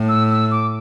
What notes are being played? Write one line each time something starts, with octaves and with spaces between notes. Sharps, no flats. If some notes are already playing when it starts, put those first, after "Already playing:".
Already playing: A2
E6
E6
D6